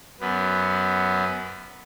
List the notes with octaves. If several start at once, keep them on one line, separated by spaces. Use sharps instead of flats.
F#2 B3